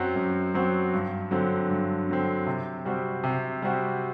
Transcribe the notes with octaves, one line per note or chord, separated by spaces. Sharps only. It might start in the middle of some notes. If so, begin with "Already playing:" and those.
Already playing: F#2 F#3 C4 F#4
F#2
F#3 C4 F#4
G2
D3 F#3 C4
G2
D3 F#3 C4
C3
G3 C4 F#4
C3
G3 C4 F#4